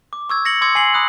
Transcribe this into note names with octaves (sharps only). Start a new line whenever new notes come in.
D6
C#6 E6 G#6
A#6 C#7 F#7
C6 D6 E6 G#6 C#7
G#5 C7 F#7
B5 D#6 F#6